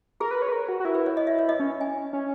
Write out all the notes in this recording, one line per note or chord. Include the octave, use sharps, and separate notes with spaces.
G#4 A#4
B4
C#5
B4
A#4
F#4
F#4
E4 A#4
B4
C#5
D#5
E5
C#5
D#5
C#4
G#5
C#4